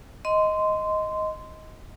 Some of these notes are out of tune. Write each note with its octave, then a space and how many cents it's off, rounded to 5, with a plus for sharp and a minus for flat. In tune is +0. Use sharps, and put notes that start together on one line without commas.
D#5 +10 C6 -15